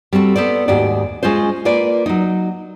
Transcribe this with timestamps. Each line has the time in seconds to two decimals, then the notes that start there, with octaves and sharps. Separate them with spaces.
0.13 G3 C4 F#4 A4
0.36 B3 A4 C5 D5
0.68 D#2 G#2 F#4 G4 D5
1.23 G#3 C#4 F4 C5
1.65 A#3 F4 B4 D5
2.06 F#3 D#4